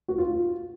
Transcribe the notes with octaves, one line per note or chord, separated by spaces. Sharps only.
F#4
F4